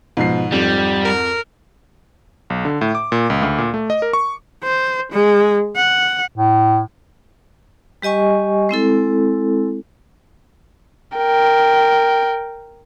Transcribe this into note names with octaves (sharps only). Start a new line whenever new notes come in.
G#2 B2 F3 C7
F2 G3
A#4
B1
D3
A2
D6
A#2
C#2
D2
A#2
A3
D#5
A#4
C#6
C5
G#3
F#5
A2
G3 G4 D#5 G#5 C#6
G#3 C4 E4 A4
A#4 G5